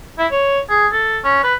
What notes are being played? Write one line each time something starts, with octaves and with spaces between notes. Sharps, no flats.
E4
C#5
G#4
A4
C#4
B4